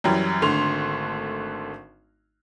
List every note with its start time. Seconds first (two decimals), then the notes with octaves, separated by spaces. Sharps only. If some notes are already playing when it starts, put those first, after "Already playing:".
0.04 F#2 E3 F#3 G3
0.42 G#1 D3 A3 C6 F7